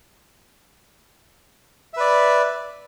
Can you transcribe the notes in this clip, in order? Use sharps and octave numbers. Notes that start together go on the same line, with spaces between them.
B4 D5 E5